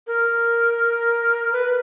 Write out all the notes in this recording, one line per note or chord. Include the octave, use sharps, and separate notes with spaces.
A#4
B4